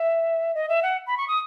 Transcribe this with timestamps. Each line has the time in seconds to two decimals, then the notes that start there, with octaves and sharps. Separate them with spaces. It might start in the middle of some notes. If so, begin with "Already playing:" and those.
Already playing: E5
0.54 D#5
0.69 E5
0.83 F#5
1.07 B5
1.18 C#6
1.28 D#6